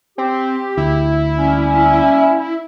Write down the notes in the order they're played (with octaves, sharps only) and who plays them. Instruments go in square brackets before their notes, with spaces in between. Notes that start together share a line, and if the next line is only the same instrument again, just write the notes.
[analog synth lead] C4 [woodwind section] G4
[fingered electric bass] D2 [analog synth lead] E4
[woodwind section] G3 A#3 C#4